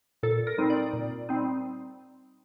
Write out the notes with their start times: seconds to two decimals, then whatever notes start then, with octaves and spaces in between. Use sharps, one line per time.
0.23 A#2 A4
0.47 A#4
0.58 G3 C4 D#4
0.70 D5
0.93 A#2
1.29 G3 C4 D#4